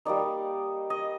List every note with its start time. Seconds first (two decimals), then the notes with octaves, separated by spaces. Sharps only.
0.05 G3 A#3 D#4 D5
0.90 D#5